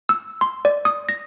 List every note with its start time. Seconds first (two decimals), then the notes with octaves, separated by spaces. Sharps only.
0.09 E6
0.41 C6
0.65 D5
0.85 D#6
1.09 A#6